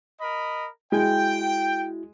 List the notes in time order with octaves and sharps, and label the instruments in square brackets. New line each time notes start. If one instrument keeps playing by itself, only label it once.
[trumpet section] A#4 D#5 B5
[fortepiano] G#3 [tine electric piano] E4 F#4 [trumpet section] G5